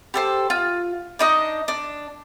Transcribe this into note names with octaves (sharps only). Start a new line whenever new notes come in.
G4 A4 C5
F4
D4 D#4 D#5
D4